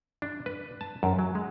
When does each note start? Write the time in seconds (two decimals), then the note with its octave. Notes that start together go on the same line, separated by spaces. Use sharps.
0.22 D4
0.46 B4
0.81 A5
1.03 F#2
1.19 F#3
1.35 G#3